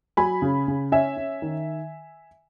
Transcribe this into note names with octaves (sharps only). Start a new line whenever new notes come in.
F#3 G#5 B5
C#3
C#3
C#4 E5 G#5
C#4
D#3